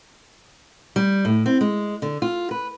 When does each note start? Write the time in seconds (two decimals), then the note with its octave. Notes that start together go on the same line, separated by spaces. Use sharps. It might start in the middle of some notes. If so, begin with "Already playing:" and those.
0.96 G3
1.25 A2
1.46 C4
1.61 G#3
2.02 D3
2.22 F4
2.51 B4